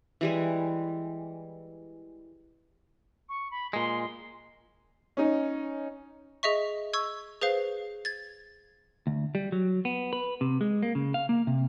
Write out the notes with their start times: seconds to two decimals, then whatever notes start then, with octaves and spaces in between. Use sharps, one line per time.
0.21 E3 G3 G#3
3.29 C#6
3.51 B5
3.73 A#2 G#3 C6
5.17 C#4 D#4
6.43 G#4 D#5 E5 C#6
6.93 C#6 E6 G#6
7.41 G#4 B4 C5 F5
8.05 G#6 A6
9.07 D2
9.35 G3
9.52 F#3
9.85 B3
10.13 B4
10.41 C3
10.61 G#3
10.83 A#3
10.95 C#3
11.14 F5
11.29 A#3
11.47 C3